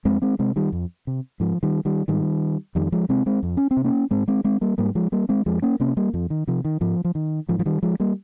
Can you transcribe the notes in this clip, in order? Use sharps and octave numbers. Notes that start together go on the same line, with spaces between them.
F2 G#3 C4
G#3 C4
C3 G#3 C4
D#3 G3
F2
C3
G#2 F3
D#3 G3
D#3 G3
G#2 D#3 G3
F2 D#3 G3
F3 G#3
C3 G#3 C4
G#3 C4
F2
C#4
C4
C3
A#3 C#4
G#2 G#3 C4
G#3 C4
G#3 C4
G3 A#3
G#2 G3 A#3
F3 G#3
G3 A#3
G#3 C4
F2 F3 G#3
A#3 C#4
C3 A#3 C#4
G3 A#3
F2 F3
D#3
C3 F3
D#3
G#2 F3
F3
D#3
G#2 F3
F3
D#3 G3
F3 G#3
G3 A#3